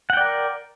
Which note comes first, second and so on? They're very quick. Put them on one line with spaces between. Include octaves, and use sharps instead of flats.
F#5 G5 D5 A#4